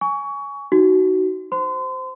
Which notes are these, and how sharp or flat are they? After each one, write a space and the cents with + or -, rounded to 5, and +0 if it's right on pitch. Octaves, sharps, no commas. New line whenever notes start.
G#5 +0 C#6 +20
D#4 +0 F#4 +15
C5 -10 C6 -35